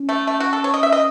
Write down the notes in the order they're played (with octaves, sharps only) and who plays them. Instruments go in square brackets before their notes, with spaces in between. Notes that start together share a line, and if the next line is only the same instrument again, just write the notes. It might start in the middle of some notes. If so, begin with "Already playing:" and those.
Already playing: [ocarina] C#4
[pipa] A3
A3
F#4
A4
C#5
D#5
E5
D#5